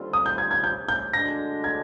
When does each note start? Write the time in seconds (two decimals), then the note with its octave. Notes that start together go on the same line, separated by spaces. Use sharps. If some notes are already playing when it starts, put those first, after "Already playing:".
Already playing: D#2 D3 G3 C4 F4
0.13 D#6
0.26 G6
0.38 G#6
0.51 G#6
0.64 G6
0.89 G6
1.13 D2 D3 G#3 D4 A#6
1.64 G#6